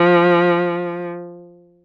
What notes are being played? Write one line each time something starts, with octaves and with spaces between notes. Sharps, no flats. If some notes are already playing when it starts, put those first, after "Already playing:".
Already playing: F3